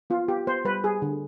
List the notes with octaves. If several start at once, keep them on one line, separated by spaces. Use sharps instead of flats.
B3 F4
B3 G4
B3 C5
G3 B4
G3 G#4
D3